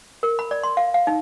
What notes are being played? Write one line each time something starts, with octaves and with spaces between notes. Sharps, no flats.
A#4
B5
D5
C6
F5
F5
D#4